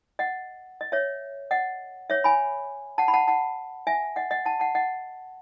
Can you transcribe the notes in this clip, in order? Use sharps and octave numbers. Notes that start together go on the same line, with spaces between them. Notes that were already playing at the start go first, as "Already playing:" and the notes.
D#5 F#5
D#5
C#5 E5
D#5 F#5
C#5 E5
G#5 B5
F#5 A5
B5
F#5 A5
F#5 A5
E5 G#5
D#5 F#5
D#5 F#5
F#5 A5
F#5 A5
D#5 F#5